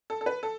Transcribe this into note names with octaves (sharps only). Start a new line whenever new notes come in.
A4
A4
B4
A4